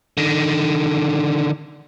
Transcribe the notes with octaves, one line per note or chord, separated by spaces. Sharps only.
D3 D#3